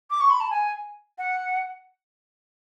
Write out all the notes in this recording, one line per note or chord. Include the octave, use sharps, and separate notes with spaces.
D6
C#6
B5
A5
G#5
F#5